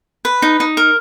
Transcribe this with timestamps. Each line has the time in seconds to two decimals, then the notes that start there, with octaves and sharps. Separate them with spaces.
0.25 B4
0.42 D#4
0.60 D#4
0.77 A#4